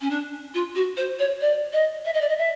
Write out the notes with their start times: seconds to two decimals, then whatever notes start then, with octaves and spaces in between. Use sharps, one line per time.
0.01 C#4
0.10 D4
0.54 F4
0.75 F#4
0.96 C5
1.18 C#5
1.41 D5
1.72 D#5
2.05 E5
2.13 D#5
2.20 D5
2.28 D#5
2.38 E5